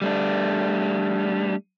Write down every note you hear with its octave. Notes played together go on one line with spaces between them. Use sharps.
G3 A3 D4